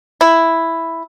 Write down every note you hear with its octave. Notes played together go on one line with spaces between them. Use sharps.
E4